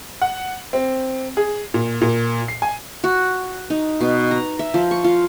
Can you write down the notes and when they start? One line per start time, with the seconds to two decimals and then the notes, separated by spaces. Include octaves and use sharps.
0.22 F#5
0.73 C4
1.37 G#4
1.74 A#2
2.01 A#2
2.48 C7
2.62 G#5
3.04 F#4
3.70 D#4
4.01 B2
4.31 A#5
4.59 E5
4.74 F3
4.91 C#6
5.04 F4